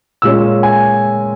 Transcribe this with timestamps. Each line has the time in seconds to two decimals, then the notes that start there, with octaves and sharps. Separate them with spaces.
0.22 A#2 G#3 C#4 E6
0.63 G#5